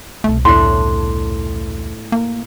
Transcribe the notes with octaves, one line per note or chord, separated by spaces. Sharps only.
C2 B2 A3
E2 A2 D4 C6
A#3